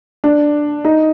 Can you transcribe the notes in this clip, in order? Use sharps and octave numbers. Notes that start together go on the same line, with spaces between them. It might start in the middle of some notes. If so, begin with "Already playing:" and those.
D4
D#4